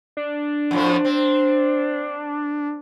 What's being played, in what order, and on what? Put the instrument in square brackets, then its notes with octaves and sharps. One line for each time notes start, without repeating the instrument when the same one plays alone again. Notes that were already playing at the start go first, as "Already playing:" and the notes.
[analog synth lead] D4
[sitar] F2 A2 F3
C4